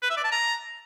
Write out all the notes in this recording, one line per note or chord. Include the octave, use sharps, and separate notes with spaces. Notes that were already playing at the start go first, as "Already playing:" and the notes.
B4
E5
D5
A5
A#5